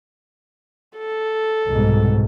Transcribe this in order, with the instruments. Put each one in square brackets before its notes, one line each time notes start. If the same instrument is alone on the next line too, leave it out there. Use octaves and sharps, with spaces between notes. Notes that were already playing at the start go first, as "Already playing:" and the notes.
[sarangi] A4
[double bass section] C2 G#2 B2